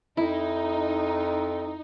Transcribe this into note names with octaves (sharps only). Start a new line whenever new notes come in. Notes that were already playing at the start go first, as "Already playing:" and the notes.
F2 D#4 E4